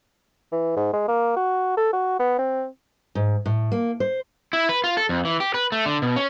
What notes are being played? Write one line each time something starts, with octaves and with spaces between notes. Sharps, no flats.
E3
G#2
G#3
A#3
F#4
A4
F#4
B3
C4
G#2
A2
A#3
C5
E4
B4
F4
A4
F2
E3
G4
B4
A3
D3
B2
C#4